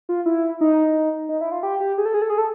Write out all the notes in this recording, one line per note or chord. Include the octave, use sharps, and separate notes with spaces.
F4
E4
D#4
D#4
E4
F4
G4
G4
G#4
A4
G#4
A4
G#4
A4